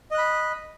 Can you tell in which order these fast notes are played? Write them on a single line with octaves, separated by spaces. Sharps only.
D#5 F#6 B5